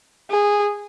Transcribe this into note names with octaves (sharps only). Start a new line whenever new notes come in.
G#4